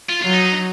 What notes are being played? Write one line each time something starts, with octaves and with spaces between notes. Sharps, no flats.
F4
F#3 F4
D#4